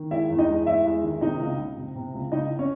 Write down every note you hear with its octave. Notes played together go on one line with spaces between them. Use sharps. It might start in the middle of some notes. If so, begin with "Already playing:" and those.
Already playing: D#3
G#3 E4 E5
E2
D#4 D#5
G#3
E2 E4 E5
G#3
D#3
C3 D#4 D#5
C#2
C#2
C3
C3
C#2
C#2 D#4 D#5
C#4 C#5